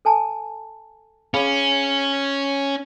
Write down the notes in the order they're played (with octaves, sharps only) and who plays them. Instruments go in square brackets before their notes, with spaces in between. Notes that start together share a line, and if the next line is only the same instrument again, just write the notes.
[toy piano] A4 G#5 A5
[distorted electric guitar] C#4 [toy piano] G#4 F5 B5